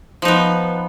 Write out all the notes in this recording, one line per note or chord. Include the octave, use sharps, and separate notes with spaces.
F3 B3 D#4